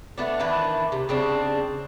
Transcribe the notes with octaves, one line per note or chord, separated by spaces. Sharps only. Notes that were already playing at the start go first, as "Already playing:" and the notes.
A3 B3 D4
D#3 E3 D4 B4
C3
C#3 C4 D4